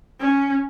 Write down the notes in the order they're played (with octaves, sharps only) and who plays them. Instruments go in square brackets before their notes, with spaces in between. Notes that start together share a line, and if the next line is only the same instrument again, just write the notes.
[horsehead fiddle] C#4